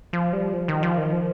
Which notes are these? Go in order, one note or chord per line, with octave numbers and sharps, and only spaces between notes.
F3
G3
F3
D#3
F3
D#3
F3